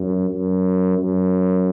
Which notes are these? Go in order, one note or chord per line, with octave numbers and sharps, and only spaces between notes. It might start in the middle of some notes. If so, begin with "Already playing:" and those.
Already playing: F#2
F#2
F#2